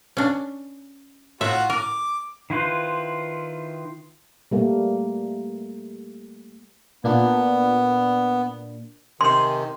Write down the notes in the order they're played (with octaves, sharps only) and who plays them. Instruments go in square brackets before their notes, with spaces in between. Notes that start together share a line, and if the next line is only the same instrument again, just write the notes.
[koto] C#4 D4
[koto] A2 E5 [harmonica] F4 F#4 F#5
[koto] A#4 [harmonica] D6
[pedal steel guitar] D#3 E4 F4 B4 C5
[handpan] G3 A3 A#3
[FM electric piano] A#2 A#3 D4 [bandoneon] B3
[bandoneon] C3 D#3 [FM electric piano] C5 G#5 [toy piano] C6